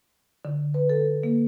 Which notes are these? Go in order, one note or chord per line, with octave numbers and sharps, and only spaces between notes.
D3
B4
A4
A#3